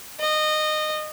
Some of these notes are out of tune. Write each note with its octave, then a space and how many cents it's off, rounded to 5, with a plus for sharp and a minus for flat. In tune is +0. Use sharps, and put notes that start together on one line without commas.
D#5 -20